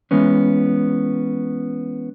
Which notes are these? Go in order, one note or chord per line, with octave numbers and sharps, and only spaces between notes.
E3 G#3 B3 C#4